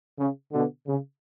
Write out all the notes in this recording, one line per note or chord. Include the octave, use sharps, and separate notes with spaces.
C#3
B2 D3
C#3